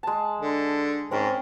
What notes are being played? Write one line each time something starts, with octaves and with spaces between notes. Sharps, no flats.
G#3 A5
D3
G#2 C4 C#4 A#4